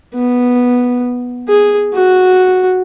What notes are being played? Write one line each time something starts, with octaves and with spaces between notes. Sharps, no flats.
B3
G#4
F#4